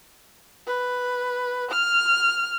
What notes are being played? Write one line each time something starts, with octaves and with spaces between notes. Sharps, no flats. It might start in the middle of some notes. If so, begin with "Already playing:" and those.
B4
F6